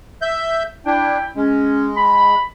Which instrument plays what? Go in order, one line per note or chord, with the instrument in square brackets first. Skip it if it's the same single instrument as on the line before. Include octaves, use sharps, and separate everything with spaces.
[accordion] E5 G6
[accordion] D4 [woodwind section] E4 G5
[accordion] G#3 [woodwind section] C#4
[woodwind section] B5